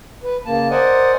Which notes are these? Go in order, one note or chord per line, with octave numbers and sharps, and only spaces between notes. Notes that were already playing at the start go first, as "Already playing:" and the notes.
B4
C#3 A#3 A5
A#4 C5 D5 D#5 F#5 G#5